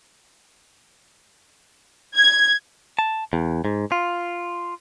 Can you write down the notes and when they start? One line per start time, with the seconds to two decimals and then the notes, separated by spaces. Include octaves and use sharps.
2.16 G#6
2.99 A5
3.33 E2
3.65 G#2
3.92 F4